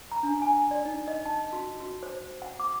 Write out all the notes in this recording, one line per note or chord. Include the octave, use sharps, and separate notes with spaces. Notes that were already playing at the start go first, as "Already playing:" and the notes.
A#5
D4
G#5
D5
D#4
D#5
A5
F#4
F#4
C5
F#5
D6